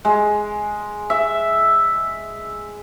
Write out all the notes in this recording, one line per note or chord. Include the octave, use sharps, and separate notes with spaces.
G#3
E5